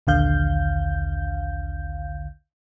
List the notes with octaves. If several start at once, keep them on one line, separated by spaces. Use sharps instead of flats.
A#1 D#2 D3 F5 G6